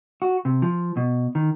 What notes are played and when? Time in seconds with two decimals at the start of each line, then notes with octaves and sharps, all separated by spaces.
0.22 F#4
0.45 C3
0.62 F3
0.97 B2
1.35 D#3